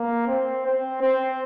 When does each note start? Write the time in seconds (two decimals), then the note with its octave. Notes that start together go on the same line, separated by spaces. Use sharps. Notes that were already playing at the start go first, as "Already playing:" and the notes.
Already playing: A#3
0.27 C4
0.66 C4
1.01 C4